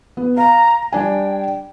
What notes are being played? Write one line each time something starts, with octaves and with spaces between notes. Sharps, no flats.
B3
F5 A#5
G3 D4 G5 G#5